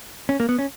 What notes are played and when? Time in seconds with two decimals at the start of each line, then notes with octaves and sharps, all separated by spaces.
0.29 C#4
0.40 A#3
0.49 B3
0.59 C#4